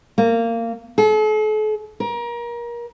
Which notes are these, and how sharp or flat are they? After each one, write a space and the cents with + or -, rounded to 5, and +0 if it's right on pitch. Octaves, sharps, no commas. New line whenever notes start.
A#3 -20
A4 -45
A#4 +30